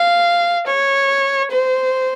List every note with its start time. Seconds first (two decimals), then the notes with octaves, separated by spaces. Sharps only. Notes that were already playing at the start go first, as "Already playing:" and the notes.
Already playing: F5
0.67 C#5
1.51 C5